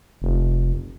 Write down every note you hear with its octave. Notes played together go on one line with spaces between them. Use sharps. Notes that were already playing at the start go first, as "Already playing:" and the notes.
F1